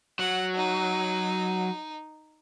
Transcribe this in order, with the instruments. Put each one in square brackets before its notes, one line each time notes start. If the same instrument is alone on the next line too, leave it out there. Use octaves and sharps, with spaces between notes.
[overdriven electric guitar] F#3 [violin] F#5
[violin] D#4